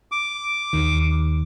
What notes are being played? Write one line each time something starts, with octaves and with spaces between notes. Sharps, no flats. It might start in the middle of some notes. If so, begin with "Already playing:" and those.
D6
D#2 D#3